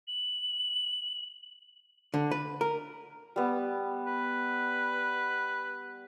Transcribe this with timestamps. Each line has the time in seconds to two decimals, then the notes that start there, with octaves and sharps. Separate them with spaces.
0.08 F#7
2.14 D3
2.31 B4
2.61 A#4
3.36 G3 B3
4.06 B4